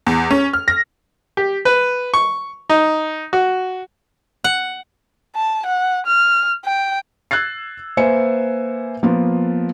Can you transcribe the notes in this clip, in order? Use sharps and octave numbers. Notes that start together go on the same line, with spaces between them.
E2
C#4
F6
A#6
G4
B4
C#6
D#4
F#4
F#5
A5
F#5
F6
G5
E6 F#6 G#6 A6 C7
A#3 B4 C5 E5 G#5 C#7
F3 A#3 B3 F4